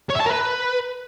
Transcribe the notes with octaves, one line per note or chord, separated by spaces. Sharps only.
C#5
E5
A5
A#4
B4